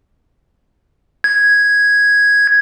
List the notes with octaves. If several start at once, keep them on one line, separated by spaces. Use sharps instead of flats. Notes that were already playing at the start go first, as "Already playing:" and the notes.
G#6